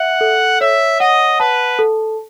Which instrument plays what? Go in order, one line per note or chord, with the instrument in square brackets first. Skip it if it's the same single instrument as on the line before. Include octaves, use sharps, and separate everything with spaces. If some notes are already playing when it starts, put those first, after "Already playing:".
Already playing: [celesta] E5 [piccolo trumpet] F#5
[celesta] A4
[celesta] C#5 [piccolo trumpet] E5
[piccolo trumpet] D#5 [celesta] F#5
[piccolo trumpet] B4 [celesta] A5
[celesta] A4